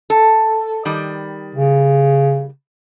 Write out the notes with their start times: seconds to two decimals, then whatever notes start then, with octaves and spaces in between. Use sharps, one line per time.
0.10 A4
0.85 D#3 G3
1.55 C#3